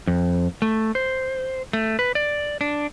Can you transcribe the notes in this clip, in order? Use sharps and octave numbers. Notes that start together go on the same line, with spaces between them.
F2
A3
C5
A3
B4
D5
D4